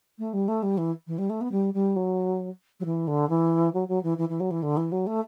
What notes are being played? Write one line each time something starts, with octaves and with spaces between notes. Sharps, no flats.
A3
G3
A3
G3
E3
E3
G3
A3
B3
G3
G3
F#3
F#3
E3
D3
E3
F#3
F#3
E3
E3
E3
F#3
E3
D3
E3
F#3
A3